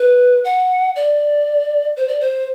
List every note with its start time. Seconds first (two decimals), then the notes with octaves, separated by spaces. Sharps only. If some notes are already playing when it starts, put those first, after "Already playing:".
Already playing: B4
0.45 F#5
0.96 D5
1.97 C5
2.08 D5
2.20 C5